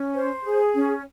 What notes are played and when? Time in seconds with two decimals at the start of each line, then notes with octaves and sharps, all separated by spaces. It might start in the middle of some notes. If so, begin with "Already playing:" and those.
Already playing: C#4
0.13 C5
0.43 G#4
0.74 C#4